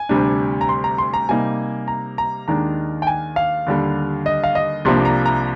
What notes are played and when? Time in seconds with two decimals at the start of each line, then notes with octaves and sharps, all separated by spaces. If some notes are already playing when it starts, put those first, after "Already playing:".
Already playing: G#5
0.09 D2 C3 G3 D4
0.61 A#5
0.69 C6
0.84 A#5
0.98 C6
1.14 A#5
1.29 C3 G3 A#3 D#4 G#5
1.88 A#5
2.18 A#5
2.48 D#2 D#3 G#3 D4 A#5
3.02 G5
3.07 G#5
3.36 F5
3.66 D#2 D3 G3
4.26 D#5
4.43 F5
4.55 D#5
4.85 C2 C3 F3 A#3 D4 C6
5.05 A#5
5.25 A#5